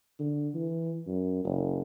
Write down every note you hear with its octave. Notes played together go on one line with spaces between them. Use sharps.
D3
E3
F#2
F#1